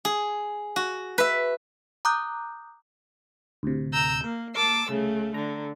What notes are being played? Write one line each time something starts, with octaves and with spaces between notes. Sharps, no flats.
G#4
F#4
B4 E5
A#5 D6 D#6 F#6 G6
D2 A2 C3
A#5 E6 G6
A#3 A#4
A#3 A#4 A5 D6 E6 C7
C2 C#3 A3
D3 A#5